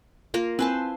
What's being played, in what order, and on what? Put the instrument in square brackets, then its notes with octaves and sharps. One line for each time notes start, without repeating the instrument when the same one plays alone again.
[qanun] A#3 F4 A#4
[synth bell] C4 E4 G#5 [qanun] B4 C5 A5